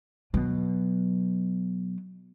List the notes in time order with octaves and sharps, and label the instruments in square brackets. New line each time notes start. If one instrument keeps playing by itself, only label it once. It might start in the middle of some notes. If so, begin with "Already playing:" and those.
[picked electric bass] B2 B3 [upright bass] F#3